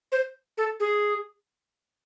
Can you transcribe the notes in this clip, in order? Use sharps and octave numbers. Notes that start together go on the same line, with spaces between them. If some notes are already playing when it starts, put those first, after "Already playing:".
C5
A4
G#4